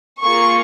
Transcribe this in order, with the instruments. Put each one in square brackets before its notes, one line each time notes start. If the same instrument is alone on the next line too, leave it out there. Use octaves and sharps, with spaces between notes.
[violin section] A#3 F4 G#4 C#6